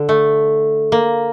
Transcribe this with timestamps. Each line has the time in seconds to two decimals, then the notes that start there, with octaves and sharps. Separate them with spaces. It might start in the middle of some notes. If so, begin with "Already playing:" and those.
Already playing: D3
0.09 A3
0.92 A#3